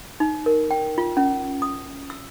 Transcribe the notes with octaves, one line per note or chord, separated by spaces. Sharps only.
D#4
A#4
G5
F4
C#4
D#6
E6